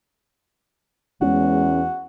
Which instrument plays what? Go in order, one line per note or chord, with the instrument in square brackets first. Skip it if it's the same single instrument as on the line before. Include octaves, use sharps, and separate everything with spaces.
[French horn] E2 [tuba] G#3 [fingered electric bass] B3 C#4 [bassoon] F#4